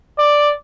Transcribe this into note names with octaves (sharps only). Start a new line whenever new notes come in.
D5